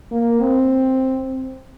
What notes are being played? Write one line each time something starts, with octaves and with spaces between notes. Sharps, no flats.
A#3
C4